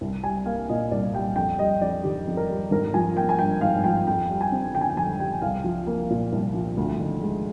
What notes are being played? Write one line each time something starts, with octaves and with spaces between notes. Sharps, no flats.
C2
G3 G#5
A#3 F5
A#2 D#5
C2 D5
G3 G5
F2 G5
G3 D#5
F2 D5
D#3 G4
F2
A#4
G3
G#1 A#4
F3 G#5
A#3 G5
G#5
G2 G5
G#1 F5
F3 G5
F2 G5
G3
G#5
C4
D3 G5
G#5
G5
F2 G#5
G3 G5
C2 F5
F3
A#3
A#2
C2
F3
D2
D#3
G#3